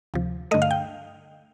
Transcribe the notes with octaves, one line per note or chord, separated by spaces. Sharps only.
D2 C3 F3
G2 D3 A3 D#5
F5
G5